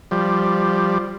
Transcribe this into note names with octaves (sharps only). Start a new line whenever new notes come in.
F3 G3